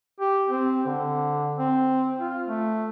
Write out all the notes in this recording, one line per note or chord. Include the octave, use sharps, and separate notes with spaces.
G4
C4
D3
C4
F4
A3